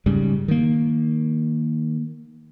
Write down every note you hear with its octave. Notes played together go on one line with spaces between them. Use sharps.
G#2 C#3 G3
D#3 A#3